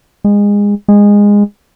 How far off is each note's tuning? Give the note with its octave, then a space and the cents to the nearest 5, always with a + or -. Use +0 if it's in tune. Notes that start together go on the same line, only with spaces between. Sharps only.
G#3 -25
G#3 -20